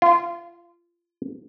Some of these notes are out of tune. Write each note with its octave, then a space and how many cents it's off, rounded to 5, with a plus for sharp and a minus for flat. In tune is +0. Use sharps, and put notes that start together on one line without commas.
F4 -25